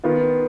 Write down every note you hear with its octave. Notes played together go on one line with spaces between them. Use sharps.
D#3 B3 F4